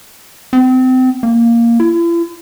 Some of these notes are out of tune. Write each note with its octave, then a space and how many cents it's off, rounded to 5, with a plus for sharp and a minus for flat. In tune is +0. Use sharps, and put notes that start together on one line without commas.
C4 -30
A#3 +0
E4 +45